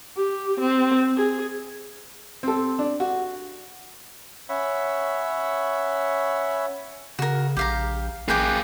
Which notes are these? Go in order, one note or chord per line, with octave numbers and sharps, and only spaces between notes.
G4
C4
G#4
C4 A4
D4
F#4
C#4 C#5 E5 F#5 B5
C#3 F#4 A#4
A#1 G4 F5 A#5
A1 A#3 G#4 B4 G5 D6